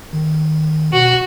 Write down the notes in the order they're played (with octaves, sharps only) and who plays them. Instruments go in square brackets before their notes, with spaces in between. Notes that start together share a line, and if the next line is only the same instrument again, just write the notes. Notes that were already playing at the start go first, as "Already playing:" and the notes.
[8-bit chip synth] D#3
[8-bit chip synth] B2 [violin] F#4